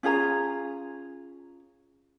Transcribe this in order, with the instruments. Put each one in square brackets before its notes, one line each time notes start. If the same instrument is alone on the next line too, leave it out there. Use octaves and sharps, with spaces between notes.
[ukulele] C#4 F4 G#4 A#5